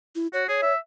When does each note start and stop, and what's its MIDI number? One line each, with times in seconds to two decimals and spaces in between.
0.15 0.27 64
0.33 0.47 66
0.33 0.44 73
0.48 0.58 68
0.48 0.72 73
0.62 0.77 76